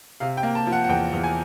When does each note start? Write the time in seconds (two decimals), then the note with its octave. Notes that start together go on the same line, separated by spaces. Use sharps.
0.20 C3 F5
0.37 G5
0.43 A#3
0.55 A5
0.67 F3
0.72 F#5
0.84 F#5
0.89 E2 G5
1.13 E2
1.24 G#5